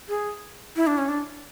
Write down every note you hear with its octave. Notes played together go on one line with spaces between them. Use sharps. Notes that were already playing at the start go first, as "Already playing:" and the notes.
G#4
E4
D4
C#4
D4